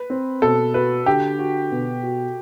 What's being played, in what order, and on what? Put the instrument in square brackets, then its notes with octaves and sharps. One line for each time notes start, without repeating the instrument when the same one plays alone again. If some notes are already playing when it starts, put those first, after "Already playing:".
Already playing: [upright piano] B4
[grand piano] C4
[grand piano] B2 [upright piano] A4
[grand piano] F#4 [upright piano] B4
[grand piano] D3 [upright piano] G4
[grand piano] F#4
B2
F#4